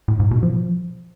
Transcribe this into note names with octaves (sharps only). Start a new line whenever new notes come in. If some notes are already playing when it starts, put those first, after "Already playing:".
A2
G#2
B2
F3